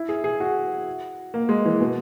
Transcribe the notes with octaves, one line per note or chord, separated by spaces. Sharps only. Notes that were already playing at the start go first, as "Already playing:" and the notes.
Already playing: E4
G#4
G#4
F#4
A#3
G#3
E3
B2